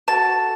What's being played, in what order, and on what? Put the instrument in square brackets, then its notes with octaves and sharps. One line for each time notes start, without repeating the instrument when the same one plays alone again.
[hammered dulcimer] F#4 A4 [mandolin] A5